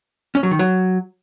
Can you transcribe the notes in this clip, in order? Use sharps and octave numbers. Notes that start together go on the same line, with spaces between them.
C#4
F#3
D#3
F#3